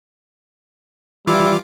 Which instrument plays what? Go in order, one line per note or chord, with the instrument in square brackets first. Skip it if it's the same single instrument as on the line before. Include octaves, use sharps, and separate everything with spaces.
[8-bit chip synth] E3 F4 D6 [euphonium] G3 [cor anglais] E4